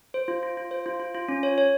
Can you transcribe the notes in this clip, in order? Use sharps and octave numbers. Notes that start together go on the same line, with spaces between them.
C5
F4
F4
F4
C5
F4
F4
F4
C#4
C#5
C#5